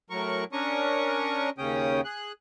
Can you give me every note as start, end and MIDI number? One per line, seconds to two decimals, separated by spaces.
0.10 0.44 45
0.10 0.44 54
0.10 0.44 70
0.10 0.44 85
0.53 1.50 61
0.53 1.50 62
0.53 1.50 70
0.53 1.50 85
0.53 1.50 87
1.58 2.01 39
1.58 2.01 49
1.58 2.01 61
1.58 2.01 79
1.58 2.01 87
2.05 2.32 68
2.05 2.32 90